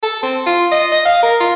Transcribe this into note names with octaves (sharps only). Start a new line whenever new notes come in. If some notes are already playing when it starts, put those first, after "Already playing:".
A4
C4
F4
D#5
D#5
F5
A#4
F4